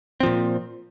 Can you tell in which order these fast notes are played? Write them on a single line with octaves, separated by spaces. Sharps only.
C4 F3 A#2